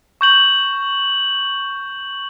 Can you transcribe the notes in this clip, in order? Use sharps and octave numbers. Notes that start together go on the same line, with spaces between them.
C#6 G6 F#7